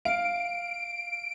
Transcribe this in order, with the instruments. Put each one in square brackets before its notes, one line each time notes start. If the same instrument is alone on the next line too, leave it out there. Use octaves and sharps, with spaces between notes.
[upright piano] F5 [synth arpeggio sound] D7